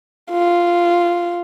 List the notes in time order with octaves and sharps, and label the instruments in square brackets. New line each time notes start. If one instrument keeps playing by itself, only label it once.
[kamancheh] F4